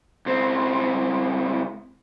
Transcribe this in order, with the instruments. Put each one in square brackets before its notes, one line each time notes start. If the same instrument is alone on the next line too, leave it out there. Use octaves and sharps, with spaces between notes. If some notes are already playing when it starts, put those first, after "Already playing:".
[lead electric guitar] C#2 C4